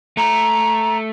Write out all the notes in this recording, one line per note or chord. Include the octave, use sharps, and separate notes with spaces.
A3 A#5